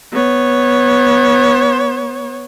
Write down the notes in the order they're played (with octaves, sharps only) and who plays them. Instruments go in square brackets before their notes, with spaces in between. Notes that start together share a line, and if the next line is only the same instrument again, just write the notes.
[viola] B3 C#5